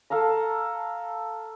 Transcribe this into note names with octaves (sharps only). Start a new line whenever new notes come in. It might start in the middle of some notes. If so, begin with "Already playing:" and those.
A4 F5 A5 A#5